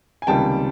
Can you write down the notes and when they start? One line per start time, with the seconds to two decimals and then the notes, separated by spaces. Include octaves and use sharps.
0.22 G#5
0.27 C#2 C3 D#3 G3 A#3 G5 A5